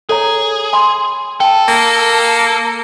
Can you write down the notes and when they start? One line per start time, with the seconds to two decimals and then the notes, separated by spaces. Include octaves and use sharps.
0.09 G#4 A4 C#5 A#5
0.73 G#5 B5 C6
1.40 A4 G5 A5
1.68 A#3